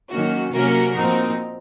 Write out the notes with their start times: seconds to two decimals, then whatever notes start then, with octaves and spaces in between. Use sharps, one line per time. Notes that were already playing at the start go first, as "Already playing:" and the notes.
0.10 D#3 F#3 A#3 C#4 F#4
0.53 C3 F#3 A#3 C#4 F#4 A#4
0.96 A#2 F3 C4 D#4